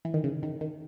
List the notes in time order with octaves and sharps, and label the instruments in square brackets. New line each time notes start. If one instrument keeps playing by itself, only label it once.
[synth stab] E3
D#3
C#3
D#3
D#3